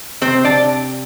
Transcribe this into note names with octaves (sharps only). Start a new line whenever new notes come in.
C3 C4 C5
D4 D5